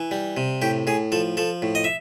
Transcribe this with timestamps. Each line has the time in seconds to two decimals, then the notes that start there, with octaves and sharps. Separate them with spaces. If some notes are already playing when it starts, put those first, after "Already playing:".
Already playing: E3
0.11 G3
0.37 C3
0.62 A2 G4
0.87 A2 G#4
1.12 F3 A4
1.37 F3 A4
1.62 A2
1.75 D#5
1.84 E5